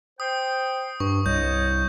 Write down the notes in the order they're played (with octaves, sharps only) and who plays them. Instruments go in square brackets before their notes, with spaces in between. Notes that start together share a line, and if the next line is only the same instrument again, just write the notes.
[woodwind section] C5 G5 [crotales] D#6
[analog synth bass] G2 [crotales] C#6
[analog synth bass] C2 [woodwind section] C#5 D#5 [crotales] G6